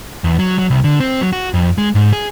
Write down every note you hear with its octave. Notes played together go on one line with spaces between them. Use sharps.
E2
F#3
F#3
C2
D3
C4
F#3
F#4
F2
G#3
G#2
G#4